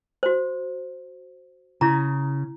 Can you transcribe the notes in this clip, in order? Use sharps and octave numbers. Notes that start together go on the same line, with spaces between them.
F#4 C5
C#3 E4 A#5